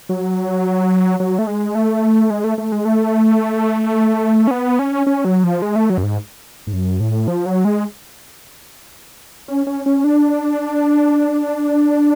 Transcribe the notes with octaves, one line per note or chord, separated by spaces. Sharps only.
F#3
F#3
A3
G#3
A3
G#3
A3
A3
G#3
A3
C#4
B3
C#4
C#4
F#3
F3
G#3
A3
F#3
F#2
G#2
G#2
F#2
A2
F3
F#3
G#3
C#4
C#4
C#4
D4